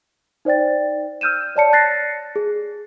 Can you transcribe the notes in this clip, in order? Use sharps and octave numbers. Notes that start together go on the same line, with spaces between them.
D#4 C5 D5 G5 A6
E6 F6 G6 D#7 E7
C#5 D5 A5 C#7
F#6 A6 A#6 C7
G#4